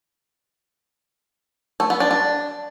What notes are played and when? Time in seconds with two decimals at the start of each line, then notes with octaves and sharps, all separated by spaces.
1.80 A3
1.90 B3
2.00 D4
2.11 D4